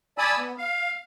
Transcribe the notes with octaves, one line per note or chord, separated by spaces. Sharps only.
D5 G#5 A5 B5 D#6 E6
B3
F5